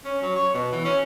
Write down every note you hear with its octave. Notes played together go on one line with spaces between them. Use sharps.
C#4
F#3
C#5
B2
E3
C#4